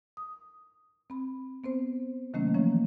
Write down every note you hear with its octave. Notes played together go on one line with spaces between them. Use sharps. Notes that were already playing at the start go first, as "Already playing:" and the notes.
D#6
C4 B5
B3 C4 C5
C3 D#3 F#3 A3 A#3 C#4
E3 F3 A#3 C#4 C#5